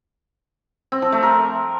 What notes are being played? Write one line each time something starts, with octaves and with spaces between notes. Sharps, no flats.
C4
F3
A3
A#4